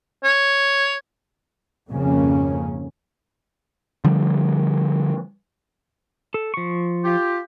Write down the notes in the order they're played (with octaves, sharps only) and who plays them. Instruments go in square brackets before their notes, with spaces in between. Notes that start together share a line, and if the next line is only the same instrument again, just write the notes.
[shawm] C#5
[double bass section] G#1 F2 C#3 A#3 C#4
[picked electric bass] D3 F3 G3
[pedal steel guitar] A4
F3 C#6
[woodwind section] F4 G4